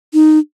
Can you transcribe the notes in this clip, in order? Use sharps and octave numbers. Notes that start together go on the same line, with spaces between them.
D#4